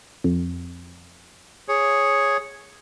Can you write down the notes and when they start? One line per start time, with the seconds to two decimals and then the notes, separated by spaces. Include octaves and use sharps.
0.24 F2
1.68 G#4 C#5